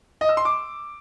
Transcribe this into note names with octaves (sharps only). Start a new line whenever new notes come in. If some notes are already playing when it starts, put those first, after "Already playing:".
D#5
E6
C6
D6